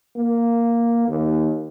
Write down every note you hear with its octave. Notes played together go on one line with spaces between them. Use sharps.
A#3
D#2